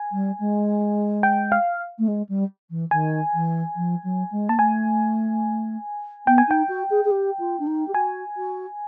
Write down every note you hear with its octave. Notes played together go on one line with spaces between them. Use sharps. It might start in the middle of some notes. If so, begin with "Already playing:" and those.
Already playing: G#5
G3
G#3
G5
F5
A3
G#3
G3
E3
D#3 G#5
E3
F3
F#3
G#3
A#3 A5
A3 G#5
B3 G5
G#5
D#4 G5
F#4
G#4
G#4
G4
F4
D4
D#4
G4
F#4 G#5
F#4